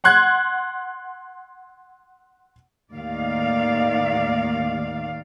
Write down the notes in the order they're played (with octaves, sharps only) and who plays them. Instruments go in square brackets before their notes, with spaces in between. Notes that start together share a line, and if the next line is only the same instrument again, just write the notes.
[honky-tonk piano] F#5 C6 F#6 G#6
[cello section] D#2 A2 D#3 D5 F5